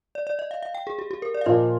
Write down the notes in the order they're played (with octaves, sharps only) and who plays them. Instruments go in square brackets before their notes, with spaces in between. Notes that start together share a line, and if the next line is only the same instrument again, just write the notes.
[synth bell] D5
D5
D#5
F5
F5
G5
G#4
G4
G4
A#4
D5
F5
[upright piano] A#2 F3 A#3 F4 [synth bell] D#5